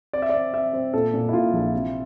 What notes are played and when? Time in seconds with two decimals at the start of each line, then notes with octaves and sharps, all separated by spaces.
0.13 C4 D5
0.22 E5
0.29 D5
0.34 C4
0.53 C4 E5
0.73 C4
0.93 A#2 A4
1.14 A#2
1.29 E4
1.33 A#2 F4
1.53 A#1
1.73 C3